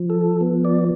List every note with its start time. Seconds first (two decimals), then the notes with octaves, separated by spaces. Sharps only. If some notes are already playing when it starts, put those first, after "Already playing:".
Already playing: F3
0.10 A4
0.41 B3
0.65 D5